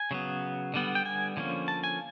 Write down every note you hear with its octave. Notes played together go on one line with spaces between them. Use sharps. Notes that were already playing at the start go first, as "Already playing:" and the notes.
Already playing: G#5
C#3 F#3 B3
D3 G3 B3
G5
G#5
D3 F3 A#3 C#4
A5
G#5